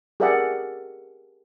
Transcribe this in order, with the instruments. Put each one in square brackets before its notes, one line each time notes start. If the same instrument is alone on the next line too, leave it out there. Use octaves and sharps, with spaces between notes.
[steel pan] G4 G#4 A#4 D5 E5 F#5